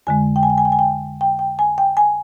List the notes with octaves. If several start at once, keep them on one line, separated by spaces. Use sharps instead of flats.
F2 D3 G#3 G#5
G5
G#5
G5
G#5
G5
G#5
G5
G5
G5
G#5
G5
G#5